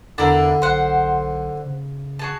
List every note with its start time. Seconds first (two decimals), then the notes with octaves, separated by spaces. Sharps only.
0.18 E2 D3 D4 E4 A#4
0.62 B1 C5 F#5
1.65 C#3
2.19 F#4 G#4 A5